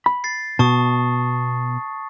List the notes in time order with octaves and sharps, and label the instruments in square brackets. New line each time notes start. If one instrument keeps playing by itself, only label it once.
[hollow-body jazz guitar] B5
[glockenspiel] A6 C7
[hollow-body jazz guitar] B2 [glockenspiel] A5 C#6 D#6